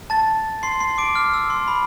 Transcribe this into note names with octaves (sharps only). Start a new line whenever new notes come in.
A5 A6
C6 C7
C6 C7
D6 D7
F6
E6
C6
B5